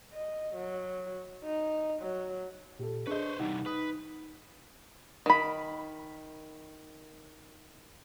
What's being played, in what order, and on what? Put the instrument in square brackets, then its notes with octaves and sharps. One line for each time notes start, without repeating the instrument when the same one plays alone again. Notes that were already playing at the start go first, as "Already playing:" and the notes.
[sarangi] D#5
F#3
D#4
F#3
[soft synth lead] A#2 [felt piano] G4 A4
[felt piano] D4 G#4 D#5 [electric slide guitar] B4 C5 [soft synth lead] C#6
[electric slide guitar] C3 E3 G3 [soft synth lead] D#4 [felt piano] F#5
[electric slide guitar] B4 [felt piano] D#6
[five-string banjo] D#3 B5